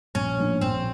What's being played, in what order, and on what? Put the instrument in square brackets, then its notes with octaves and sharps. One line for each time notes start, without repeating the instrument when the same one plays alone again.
[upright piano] A#1 [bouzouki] C#4
[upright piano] A2 F3 A#3 D4
[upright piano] A#1 [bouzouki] C4